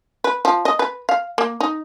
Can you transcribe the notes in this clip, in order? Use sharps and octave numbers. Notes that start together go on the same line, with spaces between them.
B4
F3
D#5
B4
F5
A#3
D#4